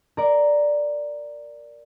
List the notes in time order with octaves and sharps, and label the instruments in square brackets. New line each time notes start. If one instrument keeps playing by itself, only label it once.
[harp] A#4 D5